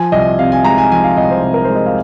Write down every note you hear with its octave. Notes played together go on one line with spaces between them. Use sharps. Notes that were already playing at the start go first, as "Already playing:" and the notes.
Already playing: F3 G#5
C2 D#5
C3 F5
G#5
G#3 A#5
G#5
F3 G#5
F5
C2 D#5
C5
C3
A#4
G#3 C5
D#5
F5